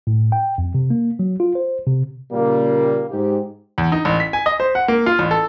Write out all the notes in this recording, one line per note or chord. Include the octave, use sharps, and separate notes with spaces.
A2
G5
F2
C3
A#3
F#3
F4
C5
C3
A#2 C#3 G3 A#3
G#2 G4
E2
D#4
A1
B6
G#5
D#5
C5
F#5
A#3
F4
A1
A4